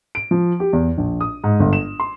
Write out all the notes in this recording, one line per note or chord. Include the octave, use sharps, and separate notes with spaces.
D7
F3
G4
E2
A#1
D#6
G#2
G1
E7
C6